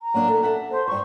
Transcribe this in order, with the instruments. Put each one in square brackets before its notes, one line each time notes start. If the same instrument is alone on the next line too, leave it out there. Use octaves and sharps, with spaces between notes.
[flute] A#5
[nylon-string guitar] F#3 A#3 D4
A4 E5
A4 E5 F#5
[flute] C5
[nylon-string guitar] G2 C5 [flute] C#6